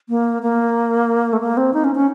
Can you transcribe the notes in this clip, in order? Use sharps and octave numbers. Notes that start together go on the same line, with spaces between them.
A#3
A#3
A3
A#3
C4
D#4
C#4
C#4